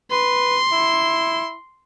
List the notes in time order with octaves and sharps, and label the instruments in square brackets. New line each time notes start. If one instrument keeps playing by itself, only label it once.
[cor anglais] B4 [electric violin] C6
[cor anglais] E4